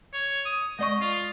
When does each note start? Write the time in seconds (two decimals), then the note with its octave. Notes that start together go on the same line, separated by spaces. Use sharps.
0.13 C#5
0.45 D#6
0.79 G#3 D5 D#5 C#6
1.02 F4